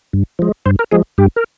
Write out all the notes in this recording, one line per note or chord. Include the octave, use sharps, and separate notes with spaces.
G2
F3 G#3
G2 C5
A#4
F3 G#3 G#4
G2 G4
A#4